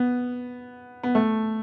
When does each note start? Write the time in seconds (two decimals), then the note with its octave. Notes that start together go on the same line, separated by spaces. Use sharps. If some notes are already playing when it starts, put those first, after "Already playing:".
Already playing: B3
1.03 B3
1.15 A3